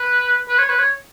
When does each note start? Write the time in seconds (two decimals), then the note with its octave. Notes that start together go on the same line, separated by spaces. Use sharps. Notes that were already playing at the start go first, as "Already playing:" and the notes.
Already playing: B4
0.49 B4
0.59 C#5
0.69 B4
0.79 C#5